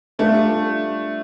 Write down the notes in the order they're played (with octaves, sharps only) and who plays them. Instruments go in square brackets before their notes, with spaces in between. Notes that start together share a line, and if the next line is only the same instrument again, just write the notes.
[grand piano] G3 D4 F4 A4 [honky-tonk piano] A3